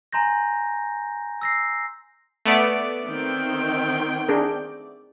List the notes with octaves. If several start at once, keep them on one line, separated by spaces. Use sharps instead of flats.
G#5 A#5 C6 G6 A#6
E6 A#6 C7
A3 B3 D5
D#3 C4 G5
D4 G#4 A#4